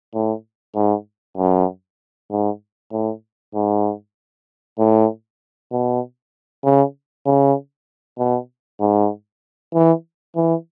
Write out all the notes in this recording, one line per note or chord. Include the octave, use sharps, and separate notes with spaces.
A2
G#2
F#2
G#2
A2
G#2
A2
B2
C#3
C#3
B2
G#2
E3
E3